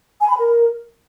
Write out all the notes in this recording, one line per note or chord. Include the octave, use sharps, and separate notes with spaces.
G#5
B5
A#4